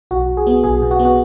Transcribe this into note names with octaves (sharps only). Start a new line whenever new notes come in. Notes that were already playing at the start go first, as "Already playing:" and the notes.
B1 F#4
B1
G#4
B3
B1 G#4
B2
F#4
B3
F#4